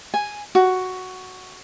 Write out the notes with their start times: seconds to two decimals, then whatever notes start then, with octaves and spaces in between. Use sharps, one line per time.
0.14 G#5
0.55 F#4